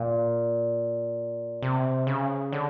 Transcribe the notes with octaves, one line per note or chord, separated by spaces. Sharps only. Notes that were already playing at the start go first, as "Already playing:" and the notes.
Already playing: A#2
C3
C#3
D3